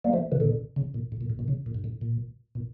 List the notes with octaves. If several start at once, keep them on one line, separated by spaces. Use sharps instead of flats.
G3 A#3
F3 A3
C#3 E3
A#2 D3
C#3
A#2
A2
A#2
A2
A#2
C#3
A#2
G2
A2
A#2
A#2